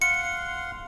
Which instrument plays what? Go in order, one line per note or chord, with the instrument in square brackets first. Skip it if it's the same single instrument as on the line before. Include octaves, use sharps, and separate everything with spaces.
[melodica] F5 F#5 C6 [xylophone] C#7